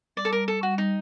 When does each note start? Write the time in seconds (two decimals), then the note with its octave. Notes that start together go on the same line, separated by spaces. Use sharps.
0.17 G3 D5
0.25 A4
0.32 G3 A#4
0.48 G3 A4
0.63 G3 F#4
0.78 G3 D#4